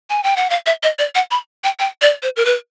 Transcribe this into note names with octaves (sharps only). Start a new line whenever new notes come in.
G#5
G5
F#5
F5
E5
D#5
D5
F#5
B5
G5
G5
D5
C5
A#4
B4